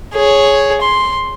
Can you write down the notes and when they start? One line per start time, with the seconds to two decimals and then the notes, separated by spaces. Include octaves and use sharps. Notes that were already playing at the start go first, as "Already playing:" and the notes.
0.13 G#4 C#5
0.81 C6